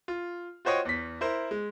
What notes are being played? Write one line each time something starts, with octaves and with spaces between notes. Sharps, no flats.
F4
F4 F#4 C5 C#5 D#5 G5
E2 B6
E4 A#4 C5
G#3